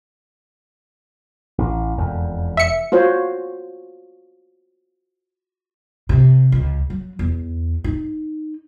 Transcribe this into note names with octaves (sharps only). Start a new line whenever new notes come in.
A1
E1 F2
E5 C#7
F4 F#4 C5 C#5
C3
C#2
F#3
E2
D#4